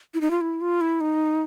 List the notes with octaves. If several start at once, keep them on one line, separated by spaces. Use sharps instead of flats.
E4
D#4
F4
E4
F4
E4
D#4